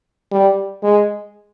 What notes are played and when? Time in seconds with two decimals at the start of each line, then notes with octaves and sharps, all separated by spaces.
0.32 G3
0.83 G#3